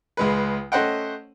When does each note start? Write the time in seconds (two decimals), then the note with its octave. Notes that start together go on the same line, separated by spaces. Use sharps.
0.17 C#2 G#3 B4
0.72 A3 C#4 C5 D#5 F#5 G5